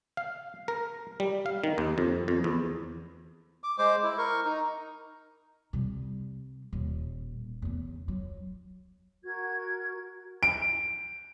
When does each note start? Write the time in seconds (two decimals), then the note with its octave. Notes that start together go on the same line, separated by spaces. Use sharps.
0.17 F5
0.68 A#4
1.20 G3
1.46 F5
1.64 D#3
1.78 D#2
1.98 F2
2.28 F2
2.44 E2
3.64 D6
3.78 G#3 C5 D6
4.03 E4
4.18 A#4 C#6
4.45 D#4
5.73 C3 G3
6.73 D#1
7.62 E2 C#3
8.08 F#3
9.23 F#4 A#4 G#6
10.43 D7